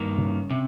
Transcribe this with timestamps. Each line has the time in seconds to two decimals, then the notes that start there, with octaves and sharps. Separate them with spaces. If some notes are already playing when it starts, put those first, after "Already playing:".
Already playing: G2 D#3 A#3
0.18 C#3
0.50 C3